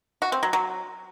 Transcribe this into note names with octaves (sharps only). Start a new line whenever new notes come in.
F#4
C4
F#3
F#3